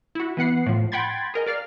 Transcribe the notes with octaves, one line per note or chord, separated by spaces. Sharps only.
E4 F#4
E3 B3 F#5 C7
A2 F3
F#5 G5 B5 C6 G#6 A6
G#4 A#4 D#5
A#4 D5 F5 F6